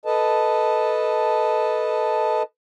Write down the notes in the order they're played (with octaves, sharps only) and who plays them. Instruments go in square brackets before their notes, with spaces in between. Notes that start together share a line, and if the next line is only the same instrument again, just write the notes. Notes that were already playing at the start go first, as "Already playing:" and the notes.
[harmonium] A4 B4 D#5 A5